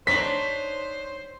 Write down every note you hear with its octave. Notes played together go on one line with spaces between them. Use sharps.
D4 D#4 C5 C#5 B6